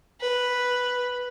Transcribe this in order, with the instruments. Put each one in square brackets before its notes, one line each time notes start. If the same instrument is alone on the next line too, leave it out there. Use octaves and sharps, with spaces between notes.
[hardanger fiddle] B4